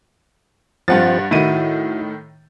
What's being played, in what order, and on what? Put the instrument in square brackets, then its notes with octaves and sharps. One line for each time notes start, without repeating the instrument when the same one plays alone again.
[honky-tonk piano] G2 F#5 A6 [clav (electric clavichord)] F3 C4 F4
[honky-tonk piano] A2 D#3 D#7 [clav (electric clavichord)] E4 F#4